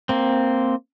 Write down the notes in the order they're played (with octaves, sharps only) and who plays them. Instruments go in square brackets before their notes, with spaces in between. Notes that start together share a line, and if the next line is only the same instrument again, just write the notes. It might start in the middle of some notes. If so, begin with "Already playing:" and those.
[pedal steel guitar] A#3 C4